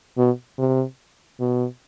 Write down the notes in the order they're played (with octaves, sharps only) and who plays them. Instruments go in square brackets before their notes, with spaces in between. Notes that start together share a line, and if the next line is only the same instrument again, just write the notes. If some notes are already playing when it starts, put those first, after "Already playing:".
[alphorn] B2
C3
B2